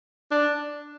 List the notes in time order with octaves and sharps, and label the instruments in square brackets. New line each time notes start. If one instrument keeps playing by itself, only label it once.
[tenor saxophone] D4